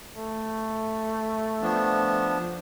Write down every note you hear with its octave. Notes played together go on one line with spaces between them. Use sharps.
A3
F3 B3 D4